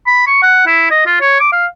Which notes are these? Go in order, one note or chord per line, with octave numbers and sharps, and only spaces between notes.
B5
C#6
F#5
E4
D#5
F4
C#5
D6
F5